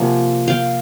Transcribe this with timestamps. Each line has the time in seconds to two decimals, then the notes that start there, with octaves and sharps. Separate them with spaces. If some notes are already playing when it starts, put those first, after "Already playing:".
Already playing: C3 F3 A#3 F#5 G#5
0.48 F5 G5